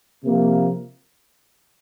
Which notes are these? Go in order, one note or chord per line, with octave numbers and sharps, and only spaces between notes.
C3 F3 A#3